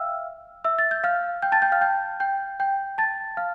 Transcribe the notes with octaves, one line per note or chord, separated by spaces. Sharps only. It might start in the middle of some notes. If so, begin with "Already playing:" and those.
Already playing: E5 F5 G5 E6 F6
E5 E6
A6
G6
F5 F6
G5 G6
A5 A6
G5 G6
F5 F6
G5 G6
G5 G6
G5 G6
A5 A6
F5 F6